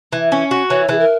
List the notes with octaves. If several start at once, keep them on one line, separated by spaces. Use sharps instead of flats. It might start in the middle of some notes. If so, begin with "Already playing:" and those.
E3
C#4
F#4
E3 C#5
E3 G#4
A#4